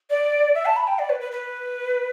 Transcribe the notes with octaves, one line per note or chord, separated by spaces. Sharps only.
D5
E5
A5
B5
G5
D5
B4
B4
B4